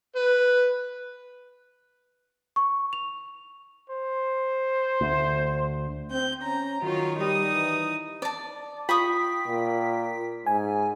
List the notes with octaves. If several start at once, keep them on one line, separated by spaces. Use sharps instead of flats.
B4
C#6
F7
C5
D2
C4 G6
C#4 A#5
D#3 F#3 F4 C#5
G3 D#4 D#6
E3
D5 A5
F4 G5 B5 C#6 D#6 B6
A#2
G#2 G#5